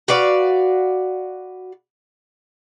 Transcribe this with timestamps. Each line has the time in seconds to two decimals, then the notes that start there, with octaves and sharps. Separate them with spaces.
0.08 F#4 B4 D5 F5